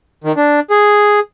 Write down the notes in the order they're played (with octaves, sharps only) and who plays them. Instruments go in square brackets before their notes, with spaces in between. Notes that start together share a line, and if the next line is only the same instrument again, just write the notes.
[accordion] D#3
D4
G#4